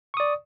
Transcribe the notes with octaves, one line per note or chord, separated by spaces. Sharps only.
D5 C#6 D#6